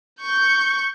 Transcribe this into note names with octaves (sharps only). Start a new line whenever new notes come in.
C#6 G6